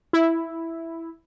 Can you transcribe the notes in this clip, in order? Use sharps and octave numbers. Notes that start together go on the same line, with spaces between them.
E4